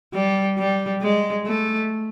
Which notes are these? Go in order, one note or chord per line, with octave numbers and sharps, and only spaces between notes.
G3
G3
G#3
A3